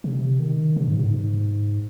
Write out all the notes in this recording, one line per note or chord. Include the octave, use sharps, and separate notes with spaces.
C3
D#3
C3
G#2
G#2